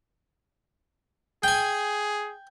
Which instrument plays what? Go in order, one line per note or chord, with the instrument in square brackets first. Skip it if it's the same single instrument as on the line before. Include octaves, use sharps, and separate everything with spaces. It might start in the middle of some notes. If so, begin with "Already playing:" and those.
[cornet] G#4 [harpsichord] G5 G#5